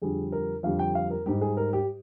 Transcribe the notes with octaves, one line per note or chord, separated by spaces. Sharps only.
F2 D3 G3 G#4
A#4
F2 D3 G3 F5
G5
F5
A#4
G#2 G3 G4
G#4
A#4
G4